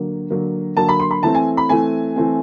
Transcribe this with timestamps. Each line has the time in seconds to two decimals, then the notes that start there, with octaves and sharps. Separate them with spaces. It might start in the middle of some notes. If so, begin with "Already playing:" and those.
Already playing: D3 F#3 A#3
0.30 D3 F#3 A#3
0.77 D3 F#3 A#3 A5
0.89 B5
1.00 C6
1.11 B5
1.23 E3 A3 C4 A5
1.35 G#5
1.57 B5
1.69 E3 A3 C4 G#5
2.16 E3 A3 C4